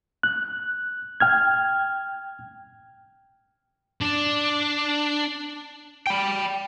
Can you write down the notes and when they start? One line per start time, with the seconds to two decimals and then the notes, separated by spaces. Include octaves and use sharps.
0.23 F#6
1.20 G5 F6 G#6
4.01 D4
6.07 G5 B5